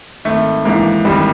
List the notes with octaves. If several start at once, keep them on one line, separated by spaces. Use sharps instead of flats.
G#1 A3
G#2 E3 A#3
G#1 G3